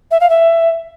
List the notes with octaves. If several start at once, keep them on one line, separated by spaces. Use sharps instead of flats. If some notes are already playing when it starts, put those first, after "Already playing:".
E5
F5
E5